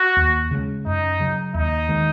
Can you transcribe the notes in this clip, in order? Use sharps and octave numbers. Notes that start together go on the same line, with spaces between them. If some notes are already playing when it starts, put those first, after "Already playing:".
Already playing: F#4
D#2
C#3 G#3
F#2 D#4
C#3 F#3
D#2 D#4
D#3 G#3